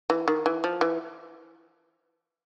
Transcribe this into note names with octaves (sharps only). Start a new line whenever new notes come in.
E3
D#3
E3
F3
E3